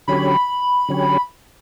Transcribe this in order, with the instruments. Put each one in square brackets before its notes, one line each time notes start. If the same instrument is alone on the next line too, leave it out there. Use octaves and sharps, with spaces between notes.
[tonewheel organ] D3 F#3 C#4 G4 C#5 [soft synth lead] B5
[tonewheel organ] D3 F#3 C#4 G4 C#5